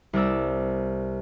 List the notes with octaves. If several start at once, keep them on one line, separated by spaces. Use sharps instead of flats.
C2 A#4 D5 E6